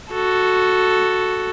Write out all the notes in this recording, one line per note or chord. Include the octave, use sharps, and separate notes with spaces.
F#4 A4